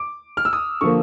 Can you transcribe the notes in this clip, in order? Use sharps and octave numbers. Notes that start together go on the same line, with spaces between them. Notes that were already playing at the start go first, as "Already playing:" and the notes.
Already playing: D6
F6
E6
D#6
D3 F3 A#3 C#6